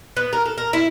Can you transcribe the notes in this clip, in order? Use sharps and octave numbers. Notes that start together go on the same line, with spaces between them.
B3
A#4
A4
A#4
E4